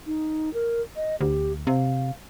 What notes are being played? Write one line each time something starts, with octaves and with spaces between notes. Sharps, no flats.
D#4
A#4
D#5
D2 G4
C3 F5